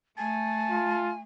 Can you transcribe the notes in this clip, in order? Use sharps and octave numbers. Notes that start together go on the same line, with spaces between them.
A3 G#5 A5
F4